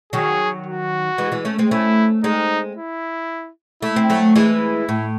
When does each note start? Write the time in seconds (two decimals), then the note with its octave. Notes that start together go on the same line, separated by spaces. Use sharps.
0.13 D#3 F#3 G#4
0.67 F#4
1.18 E3 G#3
1.32 E3 G#3
1.45 A3 C#4
1.58 G#3 C4
1.71 A3 C#4 E4
2.24 G#3 C4 D#4
2.77 E4
3.82 A3 E4
3.96 C4
4.10 F#3 A3
4.36 E3 G#3 E4
4.89 A2